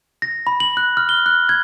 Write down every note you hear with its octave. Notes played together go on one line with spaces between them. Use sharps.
A#6
B5
F#7
F#6
F6
G7
F#6
G#6